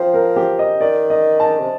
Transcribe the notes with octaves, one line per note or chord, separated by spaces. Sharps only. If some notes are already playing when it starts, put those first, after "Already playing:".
Already playing: F3 C5 G5
A#4
G4
D#5
D#3 D5
D#5
A5
C3